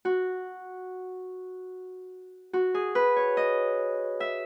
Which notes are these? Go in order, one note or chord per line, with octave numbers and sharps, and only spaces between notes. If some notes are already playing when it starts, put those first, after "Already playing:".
F#4
F#4
G#4
B4
C#5
D#5
E5